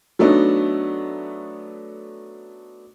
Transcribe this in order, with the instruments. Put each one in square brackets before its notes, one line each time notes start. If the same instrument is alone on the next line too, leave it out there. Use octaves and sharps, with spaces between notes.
[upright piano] F#3 A3 B3 D4 D#4